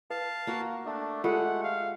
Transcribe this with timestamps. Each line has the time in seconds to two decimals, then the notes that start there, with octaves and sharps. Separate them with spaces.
0.10 B4 F5 A5
0.47 A#3 F#4 A#4
0.85 A3 D4
1.24 G#3 F4 G4 A4 F#5
1.64 F5